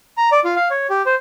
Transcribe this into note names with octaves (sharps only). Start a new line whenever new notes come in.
A#5
D5
F4
F5
C#5
G4
C5